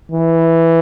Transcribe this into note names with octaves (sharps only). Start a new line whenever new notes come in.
E3